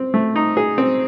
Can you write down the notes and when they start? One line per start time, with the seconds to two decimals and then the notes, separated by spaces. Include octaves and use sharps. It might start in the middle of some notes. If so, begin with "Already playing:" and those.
Already playing: C4
0.14 A3
0.36 D#4
0.57 G#4
0.78 C4